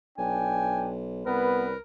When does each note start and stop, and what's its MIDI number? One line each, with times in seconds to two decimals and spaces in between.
0.18 1.22 35
0.18 1.00 62
0.18 0.92 79
0.18 0.90 80
1.26 1.74 36
1.26 1.67 59
1.26 1.79 70
1.26 1.76 71